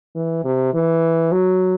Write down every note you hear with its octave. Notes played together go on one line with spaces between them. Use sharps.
E3
C3
E3
F#3